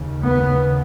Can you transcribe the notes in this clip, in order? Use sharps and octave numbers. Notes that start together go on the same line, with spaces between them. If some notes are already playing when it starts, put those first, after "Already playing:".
Already playing: D#2 C#3
B3